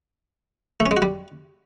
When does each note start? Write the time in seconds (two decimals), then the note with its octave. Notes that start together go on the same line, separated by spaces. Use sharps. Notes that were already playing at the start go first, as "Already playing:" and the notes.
0.80 A3
0.86 C#4
0.91 G#3
0.97 F#4
1.02 G3